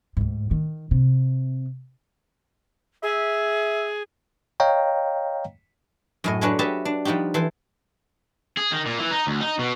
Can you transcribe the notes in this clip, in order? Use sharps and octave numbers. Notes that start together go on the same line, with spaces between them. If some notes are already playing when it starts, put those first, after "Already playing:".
D2 G#2
D#3
C3
G#4 E5
C#5 D#5 F5 G5 A#5
F#2 A2 D#5
F#3 G#3 C#4 D4 B4 C#5
G4 B4 C#5 D#5 E5 A5
D4
F3 G3 D#4 F#4 G4
E3 A4 C5
G#4
D#3
A#2
E3
D#4
D2
D#4
B2